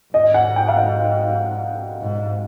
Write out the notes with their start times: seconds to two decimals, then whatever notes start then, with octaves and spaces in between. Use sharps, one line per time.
0.14 G#2 D#5
0.34 F#5
0.56 G5
0.68 F5
0.76 F#5
2.01 G#2